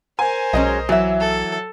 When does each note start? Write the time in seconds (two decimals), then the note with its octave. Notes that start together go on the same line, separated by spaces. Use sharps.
0.19 A#4 C5 G#5
0.53 B1 F#3 G#3 C#4 D#5
0.89 E3 F#3 E5
1.20 A4